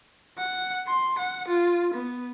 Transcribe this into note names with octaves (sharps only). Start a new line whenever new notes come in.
F#5
C6
F#5
F4
B3